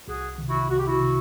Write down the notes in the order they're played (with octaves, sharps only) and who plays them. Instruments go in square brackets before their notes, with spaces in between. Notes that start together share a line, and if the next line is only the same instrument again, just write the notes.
[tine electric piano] C2 [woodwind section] F#4 G#4
[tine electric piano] C3 D#3
[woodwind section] E4 F#4
[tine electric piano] C2 [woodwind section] F#4
[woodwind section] G4
E4 F#4
[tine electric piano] C3 D#3